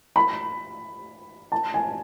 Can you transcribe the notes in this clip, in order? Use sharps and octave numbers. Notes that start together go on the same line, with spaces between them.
B5
A5
G#5